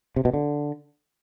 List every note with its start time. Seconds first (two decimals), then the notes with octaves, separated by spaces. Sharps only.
0.16 C3
0.25 B2
0.34 D3